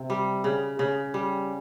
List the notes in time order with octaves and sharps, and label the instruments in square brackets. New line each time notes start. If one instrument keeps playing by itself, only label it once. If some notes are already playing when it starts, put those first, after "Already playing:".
Already playing: [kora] C3
G3
C#3
C#3
G3